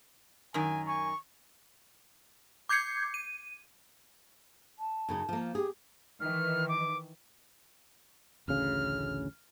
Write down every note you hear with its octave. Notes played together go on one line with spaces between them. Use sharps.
F#2 D#3 G#5
G#5 C#6
D6 G6 G#6 C7 C#7
D#7
A5
F#2 C#3 D#4
F3 A#3
G4 G#4
D#3 E3 F6
D6
A1 D2 C#3 F6